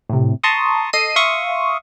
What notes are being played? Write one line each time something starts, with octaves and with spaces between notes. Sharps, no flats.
A2 C3
A5 A#5 C6 C#6 D#6
A4 D#5 C7 D#7
E5 F5 C6 C#6 D#6